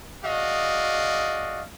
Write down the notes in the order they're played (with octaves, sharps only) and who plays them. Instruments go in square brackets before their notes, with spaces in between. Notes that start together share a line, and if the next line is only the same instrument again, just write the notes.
[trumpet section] F#4 G#4 D5 D#5 F5